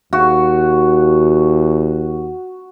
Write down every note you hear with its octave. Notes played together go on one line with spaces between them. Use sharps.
D#2 F#4